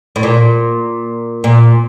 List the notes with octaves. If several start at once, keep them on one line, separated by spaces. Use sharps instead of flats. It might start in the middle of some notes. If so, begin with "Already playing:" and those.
A2
A#2
A#2